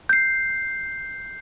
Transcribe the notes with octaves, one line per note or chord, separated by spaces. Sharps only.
G6 C7